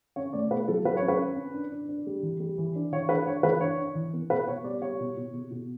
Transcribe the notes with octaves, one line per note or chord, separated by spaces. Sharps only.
C#4 C#5
A3 D5
B2 B4
F#3 A4
F#3 B4
C#5
C#4
B4
C#4
C#4
D4
D4
D4
G3
E3
G3
E3
D4
E3 C#5
D4 B4
D4 C#5
E3 B4
D4 C#5
D4
E3
B3
B2 B4
B2 C#5
G3 D5
G3 C#5
B2
B2
B2
B2